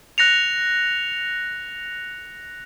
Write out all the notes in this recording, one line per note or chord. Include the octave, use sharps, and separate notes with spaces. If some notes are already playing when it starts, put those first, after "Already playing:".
F#6 A#6 C#7 F7